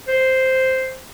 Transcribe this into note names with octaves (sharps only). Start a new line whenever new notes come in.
C5